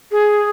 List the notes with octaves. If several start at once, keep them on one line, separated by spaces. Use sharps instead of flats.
G#4